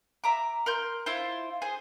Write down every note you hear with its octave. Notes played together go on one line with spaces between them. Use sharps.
E5 A#5 D6
A#4 C6 G6
E4 F4 C5
G#4 C5